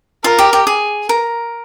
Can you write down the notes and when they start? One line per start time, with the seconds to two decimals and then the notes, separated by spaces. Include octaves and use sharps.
0.24 F4 A#4
0.39 G4
0.53 G4
0.67 G#4
1.09 A#4